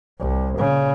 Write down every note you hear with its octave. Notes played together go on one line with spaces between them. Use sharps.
C2
A#2 C#3